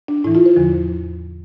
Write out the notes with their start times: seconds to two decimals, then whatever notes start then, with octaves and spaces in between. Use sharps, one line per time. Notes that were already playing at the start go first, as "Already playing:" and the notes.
0.08 D4
0.24 A2 E4
0.27 E3
0.35 F4
0.46 C5
0.56 E2 D3 F3